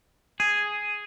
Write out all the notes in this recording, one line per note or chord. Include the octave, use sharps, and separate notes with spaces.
G#4